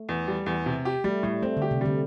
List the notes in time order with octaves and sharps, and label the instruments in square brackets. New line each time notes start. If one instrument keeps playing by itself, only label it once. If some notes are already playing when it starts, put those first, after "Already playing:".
Already playing: [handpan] A3
[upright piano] E2
G3
E2
C3
G4
[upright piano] G3 [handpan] A3
[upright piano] A2 [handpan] G3
[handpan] A3 [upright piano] C4
[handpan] D3 [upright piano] G4
[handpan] C3
[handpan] D3 [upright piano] G3